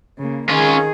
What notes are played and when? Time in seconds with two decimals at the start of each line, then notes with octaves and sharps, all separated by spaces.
0.18 C#3 A#3
0.49 D#3 C#4 F4 G#4